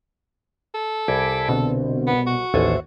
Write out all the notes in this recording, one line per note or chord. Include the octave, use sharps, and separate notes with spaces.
A4
C2 G#5 B5 D6
B2 D3 C4
B3
F#4
A1 D#2 A4 C5 E5 G#5